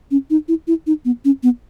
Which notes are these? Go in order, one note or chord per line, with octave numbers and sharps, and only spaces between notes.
C#4
D#4
E4
E4
D#4
B3
C#4
B3